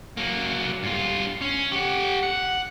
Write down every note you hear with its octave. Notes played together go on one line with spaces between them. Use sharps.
F#3 A#3
G2 F4
C#4
G4 F#5
F#5